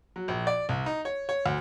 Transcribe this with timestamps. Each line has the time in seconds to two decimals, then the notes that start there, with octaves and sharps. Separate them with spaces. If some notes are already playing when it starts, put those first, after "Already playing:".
0.16 F#3
0.28 A#1
0.47 D5
0.69 C2
0.86 D#4
1.05 C#5
1.29 C#5
1.46 D2